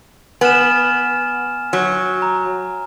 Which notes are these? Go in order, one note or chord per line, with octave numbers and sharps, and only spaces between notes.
B3 G#5 F6 E7
F#3
A#5